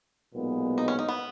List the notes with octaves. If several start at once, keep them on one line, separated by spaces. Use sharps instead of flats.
B1 A#2 G#3 B3
D#4
C#4
D#4
B3